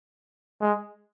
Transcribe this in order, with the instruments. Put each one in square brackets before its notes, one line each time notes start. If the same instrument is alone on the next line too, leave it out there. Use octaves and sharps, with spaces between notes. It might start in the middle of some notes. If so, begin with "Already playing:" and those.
[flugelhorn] G#3